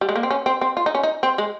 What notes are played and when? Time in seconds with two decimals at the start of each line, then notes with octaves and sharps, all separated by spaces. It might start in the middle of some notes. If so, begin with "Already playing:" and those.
0.01 G3
0.09 G#3
0.16 A#3
0.23 C4
0.31 C#4
0.46 C4
0.61 C4
0.77 F4
0.86 D#4
0.95 C#4
1.03 D#4
1.23 C4
1.38 G#3